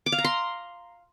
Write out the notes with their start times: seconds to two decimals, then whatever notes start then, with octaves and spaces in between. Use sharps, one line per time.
0.06 D6
0.12 F5
0.18 A#5
0.24 C6